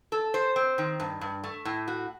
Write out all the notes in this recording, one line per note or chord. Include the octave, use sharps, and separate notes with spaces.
A4
C5
C4
D#3
G2
G2
A3
A2
F#4